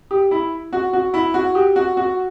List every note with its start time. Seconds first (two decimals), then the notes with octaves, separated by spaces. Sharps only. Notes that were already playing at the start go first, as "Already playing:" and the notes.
0.11 G4
0.31 E4
0.73 F#4
0.93 F#4
1.14 E4
1.34 F#4
1.55 G4
1.76 F#4
1.97 F#4